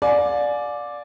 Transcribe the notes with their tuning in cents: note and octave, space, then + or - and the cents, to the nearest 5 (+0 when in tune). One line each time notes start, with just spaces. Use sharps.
D5 +0 F5 +40 G#5 +25